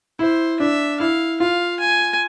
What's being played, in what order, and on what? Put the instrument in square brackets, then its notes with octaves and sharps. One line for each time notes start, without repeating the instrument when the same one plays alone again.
[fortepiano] E4 [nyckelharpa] C5
[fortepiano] D4 [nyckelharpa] E5
[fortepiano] E4 [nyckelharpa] F5
[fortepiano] F4 [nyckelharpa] F5
[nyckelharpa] G#5